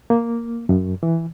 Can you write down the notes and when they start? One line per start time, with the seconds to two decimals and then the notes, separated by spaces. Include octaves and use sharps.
0.10 A#3
0.69 F#2
1.03 E3